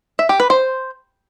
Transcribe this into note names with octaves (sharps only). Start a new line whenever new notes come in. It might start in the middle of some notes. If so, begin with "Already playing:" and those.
E5
G4
B4
C5